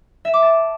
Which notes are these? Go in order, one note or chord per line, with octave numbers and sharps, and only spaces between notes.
E5
D6
A5